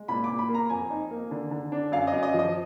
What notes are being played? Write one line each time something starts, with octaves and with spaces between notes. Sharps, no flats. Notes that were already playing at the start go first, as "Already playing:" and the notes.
Already playing: G#3
A#2 B5
A#2 D6
B5
A#3
A#5
F2 G#5
D#4
A#3
D3
D3
D4
F#2 F5
D#5
F#2
D#5
F3
D#5